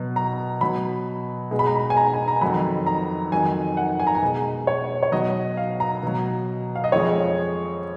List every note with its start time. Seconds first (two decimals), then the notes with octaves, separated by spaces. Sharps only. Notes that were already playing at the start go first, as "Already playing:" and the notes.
Already playing: B2 F#3
0.16 A#5
0.61 B2 F#3 B5
1.51 B2 G#3
1.59 B5
1.67 A#5
1.75 B5
1.90 G#5
1.97 A#5
2.14 G#5
2.28 A#5
2.41 F2 D#3 F#3 B5
2.87 A#5
3.32 F2 D#3 F#3 G#5
3.77 F#5
4.00 G#5
4.07 A#5
4.15 G#5
4.22 B2 G#3
4.67 C#5
5.03 C#5
5.12 B2 F#3 D#5
5.57 F5
5.80 A#5
6.03 B2 F#3
6.75 F5
6.84 D#5
6.92 F2 F3 G#3 C#5